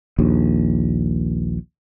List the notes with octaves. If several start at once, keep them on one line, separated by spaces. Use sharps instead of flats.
A#1 D#2